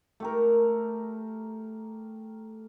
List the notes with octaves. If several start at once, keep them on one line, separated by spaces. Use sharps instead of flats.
A3 G4 A#4